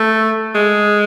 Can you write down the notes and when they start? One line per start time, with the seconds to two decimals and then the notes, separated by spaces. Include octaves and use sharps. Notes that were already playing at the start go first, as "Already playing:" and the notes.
Already playing: A3
0.55 G#3